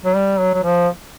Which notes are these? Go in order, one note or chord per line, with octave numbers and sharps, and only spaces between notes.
F#3
G3
F#3
F#3
F3